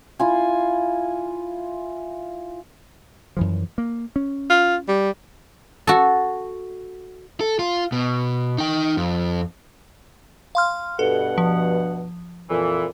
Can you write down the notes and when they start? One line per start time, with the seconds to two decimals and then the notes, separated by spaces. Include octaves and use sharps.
0.19 E4 F4 G#5
3.37 F#2 E3 F3
3.78 A#3
4.16 C#4
4.50 F4
4.88 G3
5.87 F#4 A4
7.41 A4
7.59 F4
7.92 B2
8.58 D#4 G5
8.97 F2
10.55 F5 C6 F6
10.99 G2 B2 A4 F#5
11.38 F3
12.50 F2 A#2 E3